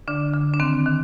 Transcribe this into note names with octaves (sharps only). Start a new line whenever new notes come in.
D3 D4
D3
D4
D#3 C4
D#3